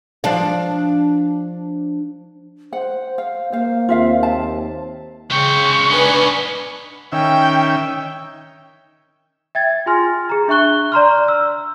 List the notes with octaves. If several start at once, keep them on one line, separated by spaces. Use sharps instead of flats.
F3 D4 F5
C5 F#5
F5
A#3 C5 F5
D#2 C4 F4 E5 F5
A5
C#3 G#3 G5 C#6
B3 D4 D#4 B4 G#5
D#3 C#4 E5 G5
E5 G5 G#6 A6
F4 G#4 G#5 C6 F6 A#6
G#4 A#5
D4 E5 C#6 F#6 G7
D5 A#5 C6 F6
E6